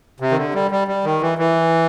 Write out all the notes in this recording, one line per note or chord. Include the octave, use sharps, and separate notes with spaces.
C3
D#3
D3
G3
G3
G3
D#3
E3
E3